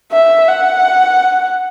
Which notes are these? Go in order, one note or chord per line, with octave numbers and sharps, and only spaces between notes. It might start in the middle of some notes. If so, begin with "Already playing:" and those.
E5
F#5